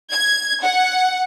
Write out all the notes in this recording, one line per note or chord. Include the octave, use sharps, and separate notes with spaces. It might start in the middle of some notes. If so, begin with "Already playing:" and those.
G#6
F#5